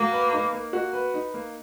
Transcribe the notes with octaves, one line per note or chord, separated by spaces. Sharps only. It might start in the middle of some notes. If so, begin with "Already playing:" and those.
Already playing: A#3 F#4
B4
D#4
A#3
F#4
B4
D#4
A#3